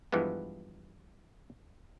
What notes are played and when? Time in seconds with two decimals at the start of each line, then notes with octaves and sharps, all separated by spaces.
0.12 G2 E3 F3 G#3 B3